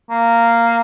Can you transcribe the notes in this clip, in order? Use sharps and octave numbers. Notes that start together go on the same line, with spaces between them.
A#3